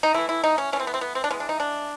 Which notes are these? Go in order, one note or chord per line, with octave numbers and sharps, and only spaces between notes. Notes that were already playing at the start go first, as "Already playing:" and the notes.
D#4
E3 A3 E4
E4
D#4
C#4
E3 A3 C4 C#4
B3
C4
B3
C4
D4
E3 G#3 B3 C#4
D4
D#4
D4